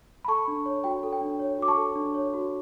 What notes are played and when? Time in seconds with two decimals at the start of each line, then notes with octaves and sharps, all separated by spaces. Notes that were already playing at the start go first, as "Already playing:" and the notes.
0.25 B5
0.28 A4 A5 C#6
0.48 D4
0.66 C#5
0.84 F#4 G5
1.03 A4
1.13 G5
1.21 D4
1.39 C#5
1.59 F#4 D6
1.68 A5 C#6
1.77 A4
1.96 D4
2.14 C#5
2.34 F#4